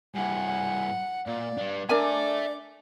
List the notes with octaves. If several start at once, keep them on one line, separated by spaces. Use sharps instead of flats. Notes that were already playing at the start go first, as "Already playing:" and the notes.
G2 E4 F#5 G#5
A#2 D5 F5
G3 D4
D4 A#4 D5 E5 G#5 A5 D6